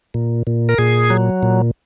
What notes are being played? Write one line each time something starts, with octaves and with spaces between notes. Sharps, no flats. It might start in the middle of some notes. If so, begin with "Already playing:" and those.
A#2
A#2
A#4
A#2 G#4
F#3
A#2